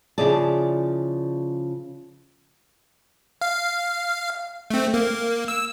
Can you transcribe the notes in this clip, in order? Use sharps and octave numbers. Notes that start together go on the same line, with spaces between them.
C#3 F3 E4 G#4 D5 A5
F5
A3 C4
A#3
E6